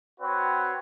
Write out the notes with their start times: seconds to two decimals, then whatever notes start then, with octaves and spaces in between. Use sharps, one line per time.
0.20 C4 F#4 B4 C#5